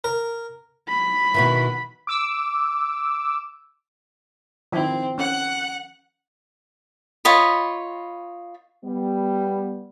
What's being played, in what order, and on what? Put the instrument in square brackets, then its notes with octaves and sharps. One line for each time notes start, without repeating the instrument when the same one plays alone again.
[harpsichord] A#4
[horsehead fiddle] B5
[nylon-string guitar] B2 D#3 E3
[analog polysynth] D6 E6
[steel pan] D#3 F3 E4 [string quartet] C4
[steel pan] C#4 [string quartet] F#5 F#6
[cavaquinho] F4 C#5 D#5 B5
[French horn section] G3 B3